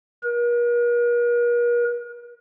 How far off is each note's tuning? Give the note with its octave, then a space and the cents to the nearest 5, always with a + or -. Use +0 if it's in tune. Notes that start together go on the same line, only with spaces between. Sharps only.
A#4 +45